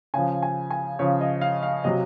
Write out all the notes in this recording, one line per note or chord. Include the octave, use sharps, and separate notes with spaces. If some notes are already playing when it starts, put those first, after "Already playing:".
C#3 F3 G#5
G#5
G#5
C#3 F3 C#5
D#5
F5
F5
C3 F#3 D#5